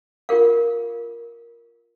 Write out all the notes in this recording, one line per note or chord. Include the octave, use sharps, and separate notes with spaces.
F4 A#4 F5